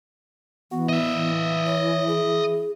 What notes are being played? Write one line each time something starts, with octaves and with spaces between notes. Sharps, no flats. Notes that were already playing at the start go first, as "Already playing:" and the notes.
E3 B3 F#4
E4 D#5 E5
E3
C#5
G#4